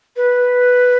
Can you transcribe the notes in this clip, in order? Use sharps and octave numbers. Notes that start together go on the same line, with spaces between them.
B4